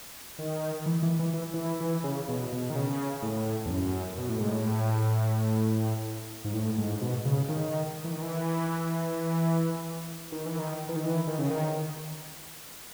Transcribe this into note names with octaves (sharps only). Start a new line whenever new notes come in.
D#3
E3
E3
E3
E3
E3
E3
C#3
B2
B2
D#3
C#3
A2
E2
F#2
B2
A2
G#2
A2
G#2
A2
G#2
B2
C#3
D#3
E3
D#3
E3
D#3
E3
D#3
E3
D#3
E3
D#3
C#3
D#3